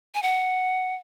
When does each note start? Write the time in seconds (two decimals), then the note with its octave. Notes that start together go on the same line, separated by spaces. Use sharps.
0.14 G#5
0.22 F#5